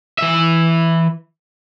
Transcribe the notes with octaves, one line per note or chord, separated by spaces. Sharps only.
E3 E5